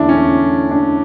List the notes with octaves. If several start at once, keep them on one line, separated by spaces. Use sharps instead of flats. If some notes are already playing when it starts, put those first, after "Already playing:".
Already playing: E2 D3 A3 D4 E4
C#4
D4